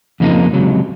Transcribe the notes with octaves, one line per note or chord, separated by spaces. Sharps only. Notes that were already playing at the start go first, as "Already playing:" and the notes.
F2 C#3 F3 A#3 D#4
C#2 C3 F#3